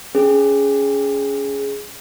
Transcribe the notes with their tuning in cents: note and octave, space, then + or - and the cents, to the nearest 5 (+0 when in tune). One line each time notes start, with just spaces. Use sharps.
C#4 +20 G#4 +0